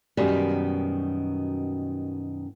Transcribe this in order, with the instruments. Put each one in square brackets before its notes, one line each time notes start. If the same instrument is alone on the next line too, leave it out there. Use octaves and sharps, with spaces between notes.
[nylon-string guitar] F#2 B2 D#3 G3